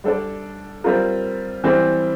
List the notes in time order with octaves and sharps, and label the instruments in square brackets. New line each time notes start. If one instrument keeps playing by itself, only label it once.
[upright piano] G3 D4 A4 D5
G3 C4 F4 A#4
E3 G3 C4